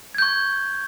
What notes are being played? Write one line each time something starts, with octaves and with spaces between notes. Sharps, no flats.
C#6 G6 G#6